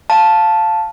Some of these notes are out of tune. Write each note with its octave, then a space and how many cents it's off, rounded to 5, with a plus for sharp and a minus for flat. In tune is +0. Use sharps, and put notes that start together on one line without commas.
F5 +0 A5 +0